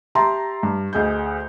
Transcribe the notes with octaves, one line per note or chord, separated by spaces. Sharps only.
G4 E5 A5 A#5 C6
G2
D2 G#4 D#5 G6